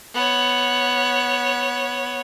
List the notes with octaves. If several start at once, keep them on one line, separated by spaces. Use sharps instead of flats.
B3 C#5